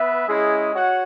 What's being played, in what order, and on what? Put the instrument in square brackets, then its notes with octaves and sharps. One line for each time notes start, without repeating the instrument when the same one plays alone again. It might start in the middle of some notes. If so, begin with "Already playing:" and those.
Already playing: [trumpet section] B3 B4 E5
G#3 C#4 E4 G#4 D#5
F#4 C#5 F#5